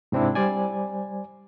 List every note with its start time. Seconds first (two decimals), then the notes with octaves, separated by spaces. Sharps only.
0.12 G#2 C3 C4 D4 E4
0.35 G3 C5 D5 G#5